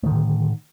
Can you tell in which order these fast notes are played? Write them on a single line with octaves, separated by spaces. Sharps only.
A3 D#3 D3 A2